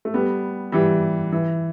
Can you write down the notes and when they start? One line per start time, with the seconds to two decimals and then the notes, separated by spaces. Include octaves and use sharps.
0.05 A3
0.14 G3 B3
0.72 E3 G3
1.32 E3